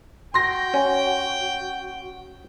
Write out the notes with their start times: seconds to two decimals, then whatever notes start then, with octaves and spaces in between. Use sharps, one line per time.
0.34 F#4 G5 C6 A#6
0.74 C#4